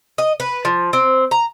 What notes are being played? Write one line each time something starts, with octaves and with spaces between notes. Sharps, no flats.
D#5
B4
F3
C4
A#5